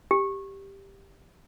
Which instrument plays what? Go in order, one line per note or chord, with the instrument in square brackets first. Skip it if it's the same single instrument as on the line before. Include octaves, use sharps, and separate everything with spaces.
[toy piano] G4